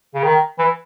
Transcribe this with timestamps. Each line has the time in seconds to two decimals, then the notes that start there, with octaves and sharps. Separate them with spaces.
0.14 C#3
0.23 D#3
0.59 E3